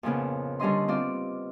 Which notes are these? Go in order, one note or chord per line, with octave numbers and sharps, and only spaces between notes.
F2 A#2 C#3 B3
D3 G3 C#4 D#5 C6
B3 C4 F4 D5